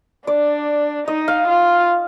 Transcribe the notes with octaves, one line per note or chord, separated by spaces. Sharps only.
D4 D5
D#4 D#5
F5
F4